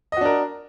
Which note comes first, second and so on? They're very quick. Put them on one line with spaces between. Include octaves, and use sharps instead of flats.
D#5 F#4 D4 A#4